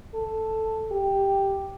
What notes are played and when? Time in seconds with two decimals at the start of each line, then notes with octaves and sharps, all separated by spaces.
0.14 A4
0.92 G4